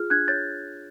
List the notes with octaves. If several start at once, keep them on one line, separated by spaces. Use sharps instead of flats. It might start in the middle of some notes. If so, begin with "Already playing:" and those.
Already playing: F4 G#4 F6
D4 F#6 G#6
C#5 G6 A6